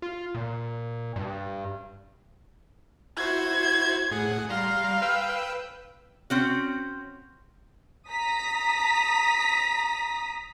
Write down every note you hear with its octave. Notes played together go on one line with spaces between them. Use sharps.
F4
A#2
G2
E4 F#4 C5 G#6
A2 G#4 F#5
G3 F5 A#5 C6
B4 G5 E6
C4 C#4 F#4
A#5 D#6 B6